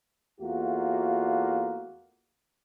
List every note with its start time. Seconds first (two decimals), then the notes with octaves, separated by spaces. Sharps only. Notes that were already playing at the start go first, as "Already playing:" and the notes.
0.41 E2 A3 A#3 F4 F#4